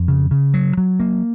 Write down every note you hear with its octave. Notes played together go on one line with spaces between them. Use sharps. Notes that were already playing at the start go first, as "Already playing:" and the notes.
Already playing: F2
C#3
C#3
F#3
F#3
A#3